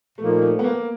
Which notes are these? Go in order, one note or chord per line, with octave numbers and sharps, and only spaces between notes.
A#2 F3 A3 A#3 D#4
A3
B3
A#3